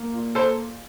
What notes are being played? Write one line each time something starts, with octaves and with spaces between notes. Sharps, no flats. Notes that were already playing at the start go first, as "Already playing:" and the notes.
Already playing: A#3
A#2
A4 C5